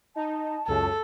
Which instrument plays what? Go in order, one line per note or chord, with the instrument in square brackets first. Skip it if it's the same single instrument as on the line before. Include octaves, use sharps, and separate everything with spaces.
[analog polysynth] D#4 [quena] A5
[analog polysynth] C#2 F#2 C#3 [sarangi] A4